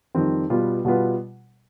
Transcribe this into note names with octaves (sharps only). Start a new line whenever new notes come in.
F2 D#3 G3 C4
B2 G3 B3 F4 B4
B2 G3 B3 F4 B4